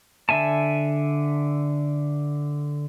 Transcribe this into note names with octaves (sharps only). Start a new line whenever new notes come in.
D3 E5 G#5 A5